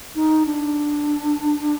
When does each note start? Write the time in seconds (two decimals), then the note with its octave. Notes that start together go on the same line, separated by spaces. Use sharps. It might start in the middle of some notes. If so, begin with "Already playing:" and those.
0.15 D#4
0.46 D4